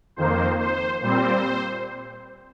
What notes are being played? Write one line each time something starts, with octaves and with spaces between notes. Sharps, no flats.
F2 D#3 A#3 C5
C5
A#2 G3 C4 C5